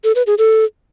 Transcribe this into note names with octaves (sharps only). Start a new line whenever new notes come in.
A4
B4
G#4
A4